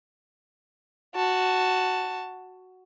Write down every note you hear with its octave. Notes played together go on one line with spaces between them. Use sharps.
F#4 A5